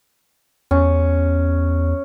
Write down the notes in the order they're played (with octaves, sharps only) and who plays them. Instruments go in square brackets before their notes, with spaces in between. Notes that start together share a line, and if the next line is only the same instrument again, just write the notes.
[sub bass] E2 [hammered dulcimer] C#4